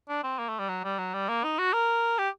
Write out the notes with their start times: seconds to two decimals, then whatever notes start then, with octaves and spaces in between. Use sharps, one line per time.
0.09 D4
0.24 C4
0.39 A#3
0.49 A3
0.59 G3
0.69 F#3
0.84 G3
0.99 F#3
1.14 G3
1.29 A#3
1.44 D#4
1.59 F#4
1.73 A#4
2.19 G4